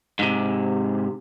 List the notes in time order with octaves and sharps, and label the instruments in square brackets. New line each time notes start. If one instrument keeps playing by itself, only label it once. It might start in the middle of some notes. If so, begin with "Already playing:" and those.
[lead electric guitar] G#2 C3